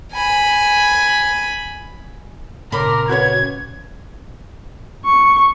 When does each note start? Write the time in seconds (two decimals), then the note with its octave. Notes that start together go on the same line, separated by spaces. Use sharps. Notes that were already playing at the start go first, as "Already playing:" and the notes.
0.13 G#5 B5
2.72 A#2 C#3 C#4 A#4 B5 C6 D6
3.09 F#4 B4 C#5 G#6
5.05 C#6